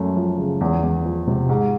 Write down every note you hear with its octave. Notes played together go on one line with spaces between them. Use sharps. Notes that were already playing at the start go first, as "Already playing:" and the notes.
Already playing: F#2 A3
F3
C#3
E2
E2
F3
C3
G#2